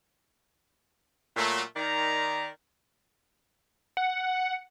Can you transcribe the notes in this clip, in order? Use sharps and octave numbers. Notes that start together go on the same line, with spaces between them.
A#2 F#3 A3
D#3 D5 A#5
F#5